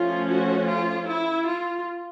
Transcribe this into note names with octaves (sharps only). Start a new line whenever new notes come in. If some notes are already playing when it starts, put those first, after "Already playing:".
Already playing: F3 A3 C#4 F4
F#4
F4
E4
F4